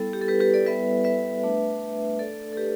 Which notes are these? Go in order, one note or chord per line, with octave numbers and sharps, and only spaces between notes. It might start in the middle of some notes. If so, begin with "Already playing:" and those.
Already playing: G3 B3 E4 A4
G4
A4
G4 B4
G4 B4
A4 D5
G3 B3 E4 B4 E5
B4 E5
A3 D4
A3 D4 A4 D5
A4
G4 B4